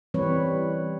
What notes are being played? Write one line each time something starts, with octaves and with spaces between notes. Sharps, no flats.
E3 G3 C4 B4 C#5